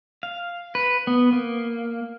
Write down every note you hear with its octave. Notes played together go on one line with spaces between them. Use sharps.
F5
B4
B3
A#3